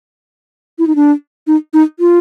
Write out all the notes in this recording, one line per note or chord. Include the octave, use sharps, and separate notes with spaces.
E4
D#4
D4
D#4
D#4
F4